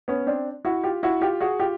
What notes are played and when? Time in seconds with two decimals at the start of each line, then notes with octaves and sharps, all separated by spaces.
0.08 B3 C#4
0.27 C4 D4
0.65 E4 F#4
0.84 F4 G4
1.03 E4 F#4
1.21 F4 G4
1.40 F#4 G#4
1.59 F4 G4